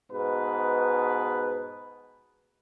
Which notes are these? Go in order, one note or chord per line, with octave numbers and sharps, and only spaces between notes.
G#2 B2 B4